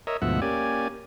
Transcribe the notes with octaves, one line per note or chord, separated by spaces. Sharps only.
A#4 C#5 D#5 E5
D2 G#2 B2 F3 E5 F#5
A#3 C#4 G4 D5 G#5